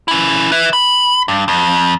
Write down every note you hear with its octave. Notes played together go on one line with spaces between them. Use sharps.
C#4 E4
B4 E5
B5
G2
F2